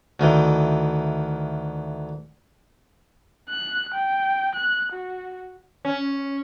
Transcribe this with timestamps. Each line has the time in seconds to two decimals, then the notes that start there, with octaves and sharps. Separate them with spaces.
0.20 D2 D#3 E3
3.49 F#6
3.94 G5
4.55 F#6
4.92 F#4
5.85 C#4